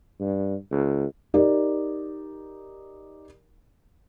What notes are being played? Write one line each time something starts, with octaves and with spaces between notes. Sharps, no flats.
G2
C#2
D#4 G4 A#4 D5